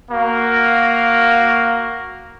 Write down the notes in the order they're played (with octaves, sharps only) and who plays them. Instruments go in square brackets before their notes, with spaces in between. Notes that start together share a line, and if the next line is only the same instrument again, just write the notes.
[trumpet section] A#3 F#4 F5